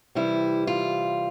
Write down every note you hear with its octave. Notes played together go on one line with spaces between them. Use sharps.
C3 E3 G3 E4
F4